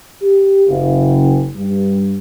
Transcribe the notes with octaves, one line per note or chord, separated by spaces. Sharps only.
G4
F#1
G2